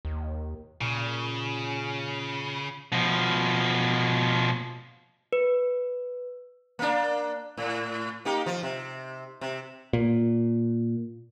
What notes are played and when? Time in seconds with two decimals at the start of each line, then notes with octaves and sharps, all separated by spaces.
0.05 D#2
0.81 A#2 C#3
2.92 B2 F3
5.33 B4
6.79 A#3 D4
7.57 A2
8.25 A#3 D#4 G4
8.46 F3
8.63 C3
9.41 C3
9.93 A#2